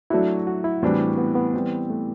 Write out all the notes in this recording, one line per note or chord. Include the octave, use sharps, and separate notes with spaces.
F#3 A3 D4 E4 F#4
F#4
E4
A2 E3 G3 C4 D4 F#4
B3
B3
E3 G3 C4
A3